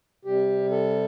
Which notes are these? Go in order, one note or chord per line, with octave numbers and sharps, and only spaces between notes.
C3 G3 G4
A4